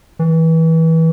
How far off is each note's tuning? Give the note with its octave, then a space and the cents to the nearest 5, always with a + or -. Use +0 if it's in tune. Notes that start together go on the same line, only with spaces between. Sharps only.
E3 -25